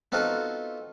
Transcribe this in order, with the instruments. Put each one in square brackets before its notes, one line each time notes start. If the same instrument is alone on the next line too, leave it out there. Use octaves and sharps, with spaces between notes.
[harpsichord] B3 C4 D#4 F4 F#4 A4